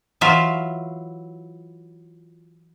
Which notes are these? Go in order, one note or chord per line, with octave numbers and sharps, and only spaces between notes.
E3 F#3 F4 E5